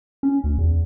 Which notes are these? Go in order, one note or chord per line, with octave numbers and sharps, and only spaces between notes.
C#4
D2
E2